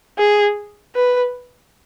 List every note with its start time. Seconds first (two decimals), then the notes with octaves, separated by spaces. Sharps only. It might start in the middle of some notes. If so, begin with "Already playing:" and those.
0.18 G#4
0.95 B4